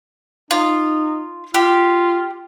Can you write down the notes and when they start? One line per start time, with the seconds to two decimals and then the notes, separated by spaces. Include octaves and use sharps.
0.51 D#4 F4
1.54 F4 G4